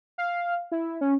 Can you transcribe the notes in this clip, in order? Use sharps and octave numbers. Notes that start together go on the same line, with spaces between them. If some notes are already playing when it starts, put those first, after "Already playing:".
F5
E4
C#4